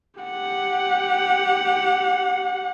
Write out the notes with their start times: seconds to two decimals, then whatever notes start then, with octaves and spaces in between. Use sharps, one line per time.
0.21 G4 F#5